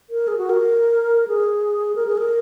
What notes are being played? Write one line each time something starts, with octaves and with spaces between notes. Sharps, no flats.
A#4
G#4
F#4
A#4
G#4
A#4
G#4
A#4